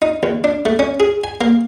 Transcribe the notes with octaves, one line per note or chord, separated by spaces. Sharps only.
D#4
D#2
D4
A3
C#4
G#4
G#5
A#3